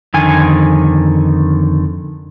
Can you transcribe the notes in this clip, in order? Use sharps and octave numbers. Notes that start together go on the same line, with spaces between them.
F2 D3 D#3 G#5